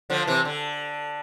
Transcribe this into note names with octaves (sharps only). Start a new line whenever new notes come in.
D3 F3
C3 E3
D3